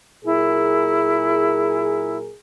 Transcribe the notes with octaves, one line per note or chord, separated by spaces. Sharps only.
A#2 F#3 E4 G#4 A#4